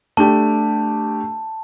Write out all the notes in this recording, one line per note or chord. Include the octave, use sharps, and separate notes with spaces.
A3 D4 G4 A5